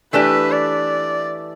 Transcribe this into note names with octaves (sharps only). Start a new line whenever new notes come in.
E3 A3 D4 G4 B4
D5